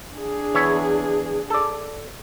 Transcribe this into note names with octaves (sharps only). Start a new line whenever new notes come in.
D4 G#4
E2 C#5 E5
A4 D5